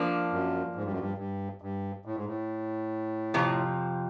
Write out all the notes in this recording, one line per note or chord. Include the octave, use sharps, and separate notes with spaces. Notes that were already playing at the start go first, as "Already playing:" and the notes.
Already playing: F3 A#3 D4
F#2
G#2
G2
F#2
G2
G2
G2
A2
G#2
A2
F2 C3 F3